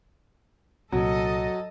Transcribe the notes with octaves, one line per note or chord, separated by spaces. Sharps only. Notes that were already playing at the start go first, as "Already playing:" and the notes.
C2 A#2 F#3 A4 D#5